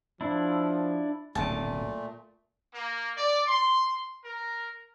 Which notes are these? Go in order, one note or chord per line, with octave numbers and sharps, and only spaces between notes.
F3 D4 E4
D1 B1 A#2 C#3 A3 A5
A#3
D5
C6
A#4